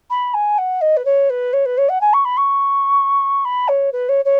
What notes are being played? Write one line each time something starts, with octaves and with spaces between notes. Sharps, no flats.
B5
G#5
F#5
D#5
B4
C#5
B4
C#5
B4
C#5
F#5
G#5
C#6
B5
C#6
B5
C#5
B4
C#5
C#5